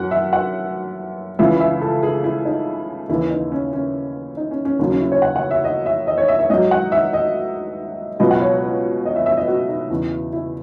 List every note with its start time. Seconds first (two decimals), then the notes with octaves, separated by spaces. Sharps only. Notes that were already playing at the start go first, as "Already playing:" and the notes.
Already playing: F#2 F#3 F#5
0.11 E5
0.33 F#5
1.39 C#2 C#3 E3 E5
1.60 E5
1.82 A4
2.03 G#4
2.24 E4
2.45 D#4
3.09 D#2 C#3 E3 E4
3.30 D#4
3.52 C#4
3.73 C#4
4.37 D#4
4.51 C#4
4.65 C#4
4.79 D#2 C#3 F#3 C#4
4.90 C#4
5.01 E4
5.12 C#5
5.22 F#5
5.36 F#5
5.51 E5
5.64 D#5
5.86 E5
6.07 D#5
6.18 C#5
6.28 E5
6.39 E5
6.50 G#2 F#3 D#5
6.71 F#5
6.92 E5
7.13 D#5
8.20 C#2 B2 F#3 D#5
8.31 F#5
8.41 C#5
9.05 D#5
9.16 E5
9.26 E5
9.37 D#5
9.47 F#4
9.69 D#4
9.90 E2 C#3 E3
10.33 E4